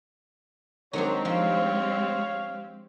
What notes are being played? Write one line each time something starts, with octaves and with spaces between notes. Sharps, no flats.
D#3 F#3 G#3 C4 D4 G4 C#5
F3 C#5 F5